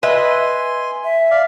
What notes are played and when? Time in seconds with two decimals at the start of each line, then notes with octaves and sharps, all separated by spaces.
0.03 B4 D#5 E5 G#5 C6
1.04 E5
1.31 D5 F5